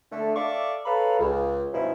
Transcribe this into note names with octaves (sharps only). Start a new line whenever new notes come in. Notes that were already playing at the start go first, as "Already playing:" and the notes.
D3 A3
A4 D5 E5 F5 C#6 D6
A4 B4 C#5 F5 A#5 B5
C#2
G2 B2 F3 C#4 D#4 E4